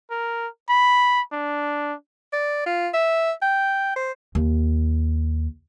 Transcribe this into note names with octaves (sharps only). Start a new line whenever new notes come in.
A#4
B5
D4
D5
F4
E5
G5
C5
D#2